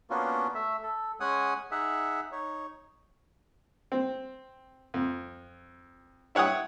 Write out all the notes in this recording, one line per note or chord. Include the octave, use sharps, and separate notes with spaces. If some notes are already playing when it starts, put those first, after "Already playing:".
A#3 B3 C#4 D4 F4 F#4
A3 E5
A4
G#3 C#4 F#5 G#5 D#6
D#4 G#4 E5 F#5
D#4 C#5
C4
F2
E4 C#5 F#5 G5 D#6